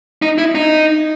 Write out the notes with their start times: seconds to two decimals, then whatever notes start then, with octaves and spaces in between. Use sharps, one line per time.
0.22 D#4
0.38 E4
0.55 D#4